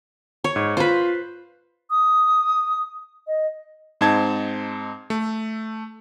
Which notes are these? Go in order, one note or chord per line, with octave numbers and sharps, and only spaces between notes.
C#5
G#2
F4 B4 C5
D#6
D#5
G#2 C4 D#4 A5 G#6
A3